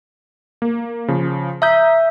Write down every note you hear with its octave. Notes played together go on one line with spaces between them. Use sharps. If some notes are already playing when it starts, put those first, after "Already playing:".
A#3
C#3 F3
E5 A#5 D#6 G6